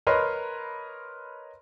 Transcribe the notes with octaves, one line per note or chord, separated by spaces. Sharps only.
A#4 B4 C#5 D#5 B5 C6